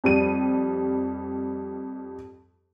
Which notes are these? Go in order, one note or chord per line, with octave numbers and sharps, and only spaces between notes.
F2 G3 D#7